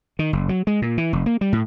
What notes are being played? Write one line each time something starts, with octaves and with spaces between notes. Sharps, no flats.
D#3
F#1
F#3
G#3
A#2
E3
F1
A#3
G3
A2